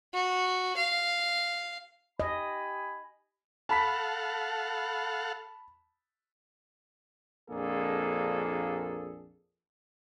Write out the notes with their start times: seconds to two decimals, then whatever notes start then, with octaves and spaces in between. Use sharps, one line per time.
0.13 F#4
0.77 F5
2.20 G4 D#5 G#5 B5
3.69 A4 F5 F#5 A5 B5 B6
7.50 A#1 F2 A#3 D4 G#4 A4